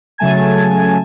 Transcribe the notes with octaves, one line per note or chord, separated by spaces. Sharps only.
C#3 F#3 A3 G#5 A5 G#6